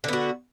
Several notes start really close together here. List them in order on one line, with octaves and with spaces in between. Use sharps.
D3 B3 F#4